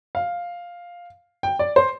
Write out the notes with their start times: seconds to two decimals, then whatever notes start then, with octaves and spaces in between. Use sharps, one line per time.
0.15 F5
1.43 G5
1.59 D5
1.76 C5